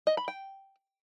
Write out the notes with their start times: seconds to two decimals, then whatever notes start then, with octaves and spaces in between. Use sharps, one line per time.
0.07 D#5
0.17 B5
0.28 G5